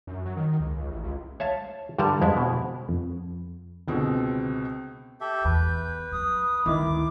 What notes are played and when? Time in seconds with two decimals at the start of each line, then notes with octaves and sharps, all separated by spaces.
0.07 F#2
0.26 F#3
0.37 D#3
0.60 C#2
0.77 C#2
0.91 A1
1.04 C#2
1.40 C#5 E5 F5 A5
1.99 G2 D3 G3 A#4 A5 A#5
2.21 F2 G#3 E4
2.37 B2
2.89 F2
3.88 C#2 B2 D3 C4
5.21 G4 A4 E5 G6
5.45 E2 B4
6.12 F#3 D#6
6.66 D2 D#3 C4 E4 D6